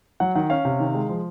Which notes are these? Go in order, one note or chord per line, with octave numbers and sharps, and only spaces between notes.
F#3 F#5
D#3 F#5
C#4 F5
C3
D#3
G#3
F3